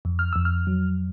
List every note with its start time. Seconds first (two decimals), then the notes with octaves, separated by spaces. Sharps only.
0.05 F2
0.19 F6
0.33 F2 E6
0.45 F6
0.67 F#3